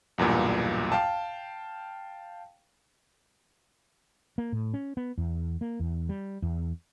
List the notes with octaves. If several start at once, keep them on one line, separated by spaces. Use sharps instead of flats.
B1 E2 G2 A#2
F5 G5 A5
A#3
A2
C#4
B3
E2
A#3
E2
G3
E2